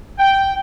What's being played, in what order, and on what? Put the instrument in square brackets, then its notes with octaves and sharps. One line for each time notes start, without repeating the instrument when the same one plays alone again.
[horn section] G5